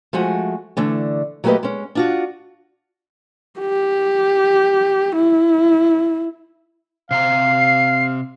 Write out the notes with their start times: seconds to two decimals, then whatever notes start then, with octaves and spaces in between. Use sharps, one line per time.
0.13 F3 G#3 A3 F#4 G#5
0.77 D3 E3 A3
1.44 F#3 A3 A#3 G4 B4 D#5
1.63 G#3 C#4
1.95 D4 F4 F#4
3.60 G4
5.16 E4
7.11 C3 C4 F5 A#5 C7